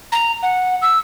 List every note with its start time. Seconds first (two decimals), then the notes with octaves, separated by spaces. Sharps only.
0.12 A#5
0.43 F#5
0.82 E6